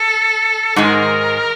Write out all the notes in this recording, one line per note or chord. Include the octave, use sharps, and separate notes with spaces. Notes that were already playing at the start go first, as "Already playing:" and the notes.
Already playing: A4
G#2 D#3 G#3 A#4